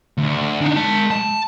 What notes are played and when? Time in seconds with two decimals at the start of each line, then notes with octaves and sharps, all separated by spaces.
0.18 D2
0.61 D4 D#4
0.76 G#3 A5
1.11 A5